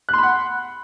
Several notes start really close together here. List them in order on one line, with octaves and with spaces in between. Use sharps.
F#6 C6 B5 F#5